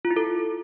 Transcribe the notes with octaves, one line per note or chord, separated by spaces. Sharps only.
F4
E4
A4